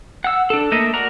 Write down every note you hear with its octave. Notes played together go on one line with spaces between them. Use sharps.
F#5 E6
D4 A4
A3 A#3 D#5 E5
F#4 A#4 D5 A#5